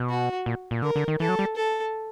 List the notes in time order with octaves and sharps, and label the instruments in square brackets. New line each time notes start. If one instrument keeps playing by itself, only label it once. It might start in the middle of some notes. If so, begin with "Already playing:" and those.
Already playing: [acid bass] B2
[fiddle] F#4
[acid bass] A#2
A#2
[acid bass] D3 [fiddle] A#4
[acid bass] D3
D#3
[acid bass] E3 [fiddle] A4
[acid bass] F#3
G3
[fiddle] A4